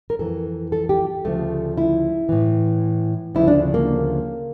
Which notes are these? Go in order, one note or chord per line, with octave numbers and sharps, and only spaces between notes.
A#4
F2 E3 A4
A4
G4
D2 C#3 F3 A3
E4
A2 E3
D2 C#3 F3 E4
D4
A#3